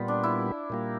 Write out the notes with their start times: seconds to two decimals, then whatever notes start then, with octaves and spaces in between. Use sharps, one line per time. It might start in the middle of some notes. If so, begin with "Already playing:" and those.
Already playing: A#2 G3 B3 F4
0.08 D4
0.23 E4
0.70 A#2 G3 A#3